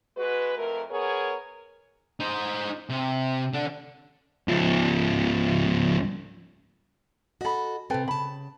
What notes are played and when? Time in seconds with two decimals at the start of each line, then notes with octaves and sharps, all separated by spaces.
0.17 G#3 F#4 B4
0.57 F2 A3 A#4
0.90 B3 G#4 A#4 C#5
2.20 D#4 C5
2.90 C3
3.54 D3 D4
4.48 C#2 F3
7.41 F#4 A4 D#5 B5
7.90 C3 C4 A4 B4 G5
8.08 C#3 A5 B5